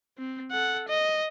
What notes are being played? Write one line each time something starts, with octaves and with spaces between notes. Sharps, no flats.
C4
A4 F#5
D#5